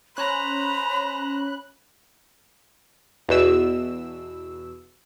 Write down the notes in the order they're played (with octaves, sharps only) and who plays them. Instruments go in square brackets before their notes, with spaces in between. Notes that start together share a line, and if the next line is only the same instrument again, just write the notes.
[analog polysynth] C#4 F#6 [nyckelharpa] C5 A#5 [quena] B5
[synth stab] E2 B2 E6